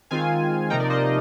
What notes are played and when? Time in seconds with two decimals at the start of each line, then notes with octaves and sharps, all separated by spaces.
0.11 D#3 G#3 C4 F4 F5 G#5
0.70 C3 F3 A#3 D#4 G5 A#5
0.80 A#4 D5
0.90 C5 D#5